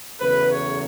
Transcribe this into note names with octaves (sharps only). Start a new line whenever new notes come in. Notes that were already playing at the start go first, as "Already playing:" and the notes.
E2 C#3 F#3 A3 B4
C#5